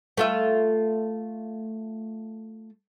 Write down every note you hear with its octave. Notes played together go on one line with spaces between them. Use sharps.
A3 F4 E5